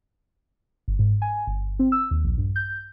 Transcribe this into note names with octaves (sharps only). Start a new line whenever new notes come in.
G1
G#2
G#5
G1
C4
E6
D#2
A#1
G2
G6